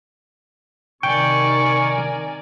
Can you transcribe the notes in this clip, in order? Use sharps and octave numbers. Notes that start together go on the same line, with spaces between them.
C3 D#3 A#4 D5 G5 G#5 C#6